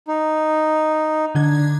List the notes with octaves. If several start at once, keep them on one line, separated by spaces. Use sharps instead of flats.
D#4
D3 D4 G#6